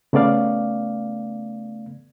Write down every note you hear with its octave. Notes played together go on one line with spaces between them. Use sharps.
C#3 A3 B3 D5 F5